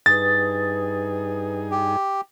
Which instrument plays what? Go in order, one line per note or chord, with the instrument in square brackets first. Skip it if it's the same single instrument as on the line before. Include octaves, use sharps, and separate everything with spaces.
[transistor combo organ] G2 D#4 G#4 [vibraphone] B4 D#6 [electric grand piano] A6
[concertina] G4